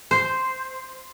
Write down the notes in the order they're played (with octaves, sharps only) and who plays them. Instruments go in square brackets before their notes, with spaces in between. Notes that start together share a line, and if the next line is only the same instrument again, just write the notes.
[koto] C5